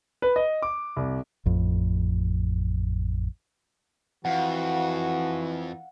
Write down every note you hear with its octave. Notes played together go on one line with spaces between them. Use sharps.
B4
D#5
D6
C2
A1 F2
F2 E3 F#4 F5 F#5